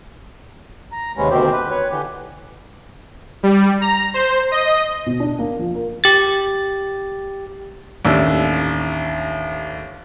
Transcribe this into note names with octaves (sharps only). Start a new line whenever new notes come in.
A#5
D#2 C3 G#3 B3 C#4
D2 B2 D#3 C4 G4 C5
G4 B4
B4 C#5
D3 E3 G4
G3
A#5
C5
D#5
B2
D4
A#3
F3
A#4
G4 A6
A1 D#2 D4 E6